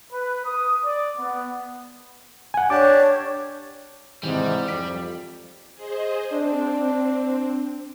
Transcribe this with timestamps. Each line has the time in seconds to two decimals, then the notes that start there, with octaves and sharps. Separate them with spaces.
0.12 B4
0.45 D#6
0.84 D5
1.18 B3
2.54 F#5 G#5
2.70 D4 G4 C#5 A5 D6
4.23 G#2 C3 E3 G3
4.68 F2 D6 B6 D7
5.75 G#4 C5 D#5
6.33 C4 D4